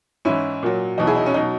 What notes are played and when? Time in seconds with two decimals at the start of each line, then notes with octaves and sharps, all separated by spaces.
0.25 G#2 E3 C#4 E4
0.63 A#2 F#3
0.98 E2 B2 F#3 D#4
1.07 E4 G#4
1.16 D#4
1.26 C#4
1.34 B2 F#3 D#4